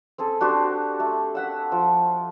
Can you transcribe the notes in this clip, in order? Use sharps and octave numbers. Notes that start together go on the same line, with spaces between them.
C4 G#4 A4
D4 F#4 G4 C5
A3
E5 F#5 E6
F3